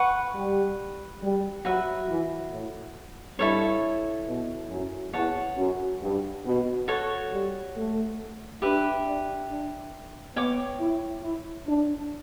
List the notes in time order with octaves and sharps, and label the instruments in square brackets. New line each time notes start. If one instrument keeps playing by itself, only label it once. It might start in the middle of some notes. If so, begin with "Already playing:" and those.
Already playing: [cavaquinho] B4 F#5 C#6
[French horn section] G3
G3
[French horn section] F#3 [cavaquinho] F#4 B4 E5
[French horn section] E3
A2
[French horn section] G2 [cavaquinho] E4 A4 C#5
[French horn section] B2
F#2
[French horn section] E2 [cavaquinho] C#5 F#5 A5
[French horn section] F#2
G2
B2
[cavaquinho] F#4 A4 C#5
[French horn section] G3
A3
[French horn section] D4 [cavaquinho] G4 B4 E5
[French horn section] D4
D4
[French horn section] B3 [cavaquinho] C#5 G5 D6
[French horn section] E4
E4
D4